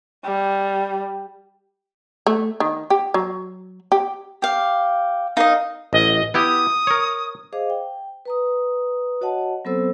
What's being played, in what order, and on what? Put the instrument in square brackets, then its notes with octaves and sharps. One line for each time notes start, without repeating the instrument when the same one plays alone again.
[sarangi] G3
[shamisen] A3
D#3
G4
F#3
G4
[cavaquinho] G4 F5
[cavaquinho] D#4 D#5 [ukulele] A#4 F5
[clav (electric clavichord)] A1 [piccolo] D#5
[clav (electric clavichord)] B3 E4 G4 [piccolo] D#6
[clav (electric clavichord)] A#4 C#5
[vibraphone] G#4 C5 D#5 F5 D6
G5
B4 A#5 D#6
F#4 C#5 D#5 F#5 A5
F#3 B3 C4 A4 C5 E6